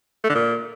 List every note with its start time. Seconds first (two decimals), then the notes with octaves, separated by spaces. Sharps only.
0.24 A3
0.29 D3
0.34 A#2